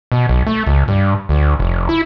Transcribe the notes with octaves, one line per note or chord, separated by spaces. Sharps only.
B2
B1
A3
C#2
G2
D2
F1
E4